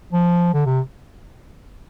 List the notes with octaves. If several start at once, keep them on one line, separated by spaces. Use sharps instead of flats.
F3
D3
C3